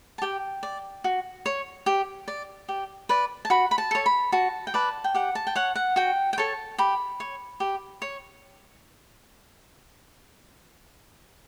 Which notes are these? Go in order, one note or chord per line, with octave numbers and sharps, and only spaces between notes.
A5
G4 G5
D5
F#4
C#5
G4
D5
G4
B4 D5
A5
F#4 B5
B5
A5
A4 C#5
B5
F#4 A5
G5
B4 D5 A5
G5
G4 F#5
A5
G5
C#5 F#5
F#5
F#4 G5
G5
A4 C#5 A5
G4 B5
C#5
G4
C#5